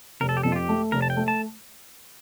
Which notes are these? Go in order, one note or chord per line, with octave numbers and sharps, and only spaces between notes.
F1 A#4
A4
G4
F2 A4
F4
G4
A3
F1 A#4
A5
G5
A3
A5